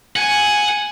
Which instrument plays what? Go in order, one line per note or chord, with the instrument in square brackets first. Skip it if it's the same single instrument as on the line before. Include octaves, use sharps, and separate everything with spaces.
[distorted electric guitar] F#5 [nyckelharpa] G#5